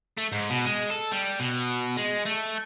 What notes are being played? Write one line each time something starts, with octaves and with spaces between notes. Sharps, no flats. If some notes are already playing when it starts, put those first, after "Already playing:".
A3
G#2
B2
G#3
A4
G3
B2
G#3
A3